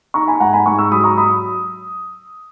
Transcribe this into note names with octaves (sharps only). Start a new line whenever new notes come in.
D#4 A#5 C#6
G#5 B5
G#2 F#5 A#5
G#5 B5
G#2 A#5 C#6
C#6 E6
F#3 B5 D#6
A#5 C#6
B5 D#6